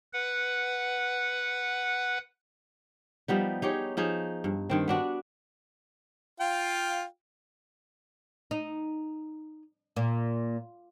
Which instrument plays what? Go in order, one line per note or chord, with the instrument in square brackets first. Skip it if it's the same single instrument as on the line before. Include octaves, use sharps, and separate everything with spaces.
[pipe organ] B4 F#5
[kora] F3 G3 B3 D#4
D#4 G4 G#4 C#5
F3 D#4 G#4
G2
G2 D#3 C4
B3 D4 F#4
[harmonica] F4 F5 G5
[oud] D#4
A#2